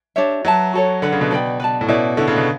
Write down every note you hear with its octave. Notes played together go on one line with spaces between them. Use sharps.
D4 G4 C#5 E5
F#3 B4 E5 A5
F#4 A4 C#5
D3 B4 F#5 B5
C#3
B2
A4 D5 G5 B5
B4 D5 A5
A2
B2 C#4 E4 A4 D5
D3 C#4 E4 A4
C#3
B2